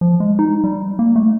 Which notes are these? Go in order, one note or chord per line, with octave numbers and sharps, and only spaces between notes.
F3
G#3
D#4
G3
A#3
A3